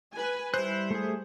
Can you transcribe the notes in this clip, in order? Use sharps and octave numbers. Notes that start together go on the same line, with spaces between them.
B4 G#5
G3 E4 C5 F#6
A3 G#4